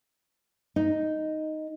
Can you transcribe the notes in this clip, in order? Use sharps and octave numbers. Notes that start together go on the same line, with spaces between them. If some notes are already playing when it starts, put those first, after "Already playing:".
D#4